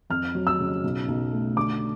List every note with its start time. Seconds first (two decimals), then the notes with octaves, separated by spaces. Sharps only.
0.10 F2 F6
0.35 F#3
0.47 E6
0.59 C#3
0.84 B1
1.08 B1
1.32 A3
1.56 D3 D6